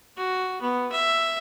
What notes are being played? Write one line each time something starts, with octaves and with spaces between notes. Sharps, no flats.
F#4
B3
E5